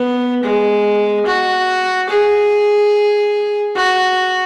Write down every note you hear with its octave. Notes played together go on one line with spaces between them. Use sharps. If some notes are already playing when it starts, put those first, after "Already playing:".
Already playing: B3
G#3
F#4
G#4
F#4